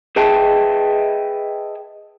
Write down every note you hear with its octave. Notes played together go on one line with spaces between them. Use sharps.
G#4 B4 D#5 E5 G5 A5